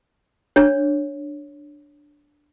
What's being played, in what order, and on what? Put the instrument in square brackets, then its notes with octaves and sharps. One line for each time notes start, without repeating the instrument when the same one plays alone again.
[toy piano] D4 C#5